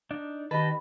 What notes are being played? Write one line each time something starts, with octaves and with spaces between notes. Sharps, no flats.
D4 D#4 D5
D#3 G4 B4 D#5 A5